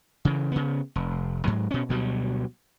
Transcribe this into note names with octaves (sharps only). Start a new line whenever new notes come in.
C#3 E3
C#3 B3
F1
G#2 F#3
B2 C#4
D2 B2 F#3 G3